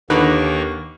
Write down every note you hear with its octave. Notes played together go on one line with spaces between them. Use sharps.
D#2 D3 D#3 A#3 D#4 B4 C#6